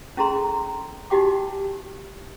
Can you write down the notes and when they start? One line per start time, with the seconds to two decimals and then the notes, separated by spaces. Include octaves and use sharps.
0.17 C#4 E4 G#4 A4 A#5 C6
1.10 D#4 E4 F#4 G4 G5 D6